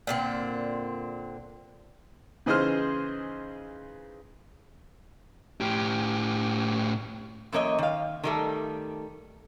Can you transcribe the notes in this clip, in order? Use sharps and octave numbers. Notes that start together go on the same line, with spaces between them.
A#2 D3 C4
C#3 E3 D#4 G#4 C5 F6
A2 G4
F#2 E3 A#3 C#5 D#5
D#3 F5
D#3 G3 A3